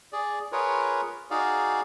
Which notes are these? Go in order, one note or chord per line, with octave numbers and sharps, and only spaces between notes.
G#4 D5
F4 G#4 A#4 B4 C#5
D#4 F#4 G#4 D5 F5